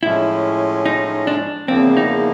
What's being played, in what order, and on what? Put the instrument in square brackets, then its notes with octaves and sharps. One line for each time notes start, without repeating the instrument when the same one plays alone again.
[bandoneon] A2 F3 G#3 C#4 [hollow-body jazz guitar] E4
[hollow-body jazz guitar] D#4
D4
[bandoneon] E2 C#3 F3 A#3 [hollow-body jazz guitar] C4
[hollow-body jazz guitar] D#4